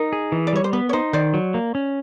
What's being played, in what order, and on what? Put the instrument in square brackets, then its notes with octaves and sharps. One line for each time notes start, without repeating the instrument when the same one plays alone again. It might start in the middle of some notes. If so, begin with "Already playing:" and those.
Already playing: [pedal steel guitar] D#4 [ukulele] A#4
[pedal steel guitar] G#4
E3
[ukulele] D5
[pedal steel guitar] G3 [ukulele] C#5
[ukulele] C5
[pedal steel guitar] B3 [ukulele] B4
[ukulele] C#5
[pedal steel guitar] D#4 [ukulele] C5
[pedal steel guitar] D#3 [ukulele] C5 D5
[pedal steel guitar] F#3
A#3
C#4